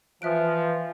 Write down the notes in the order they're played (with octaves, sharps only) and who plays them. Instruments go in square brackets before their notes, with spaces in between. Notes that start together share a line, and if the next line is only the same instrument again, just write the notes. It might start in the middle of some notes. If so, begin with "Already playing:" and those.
[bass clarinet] E3 [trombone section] F3 [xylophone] E5 F#6 D7